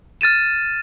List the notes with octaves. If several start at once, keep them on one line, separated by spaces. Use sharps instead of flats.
F6 A6 D#7 E7